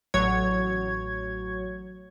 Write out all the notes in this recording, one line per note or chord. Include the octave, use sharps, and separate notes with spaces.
A1 F#3 C#5 G#6